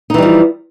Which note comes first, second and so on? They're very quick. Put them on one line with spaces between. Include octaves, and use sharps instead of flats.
D#4 E3 G3 F3